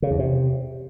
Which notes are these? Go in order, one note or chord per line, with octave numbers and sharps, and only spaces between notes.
C#3
E2
C3